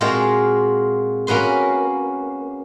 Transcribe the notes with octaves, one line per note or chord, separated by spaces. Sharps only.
A#2 G#3 C4 F4 F#4 A#5
A#3 C#4 F#4 B4 C6